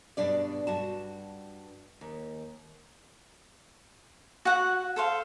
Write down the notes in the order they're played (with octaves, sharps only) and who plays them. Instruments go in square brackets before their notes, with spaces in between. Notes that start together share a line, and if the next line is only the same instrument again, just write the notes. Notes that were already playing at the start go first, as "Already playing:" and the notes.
[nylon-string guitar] G2 B2 D4 D5
G2 F#4 A5
D#2
[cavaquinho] F#4 F#5
A4 C5 F5